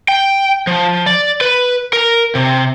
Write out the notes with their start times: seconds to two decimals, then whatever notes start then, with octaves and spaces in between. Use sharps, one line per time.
0.08 G5
0.67 F3
1.06 D5
1.41 B4
1.93 A#4
2.35 C3